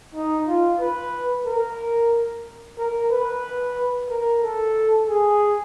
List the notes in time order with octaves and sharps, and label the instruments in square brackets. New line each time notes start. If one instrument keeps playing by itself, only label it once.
[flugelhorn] D#4
F4
B4
A#4
A#4
B4
A#4
A4
G#4